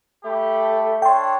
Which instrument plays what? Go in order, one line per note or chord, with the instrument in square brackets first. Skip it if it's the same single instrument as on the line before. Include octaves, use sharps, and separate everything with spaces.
[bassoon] A3 [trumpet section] G4 A5 B5
[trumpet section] D4 A4 C#5 [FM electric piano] G5 C6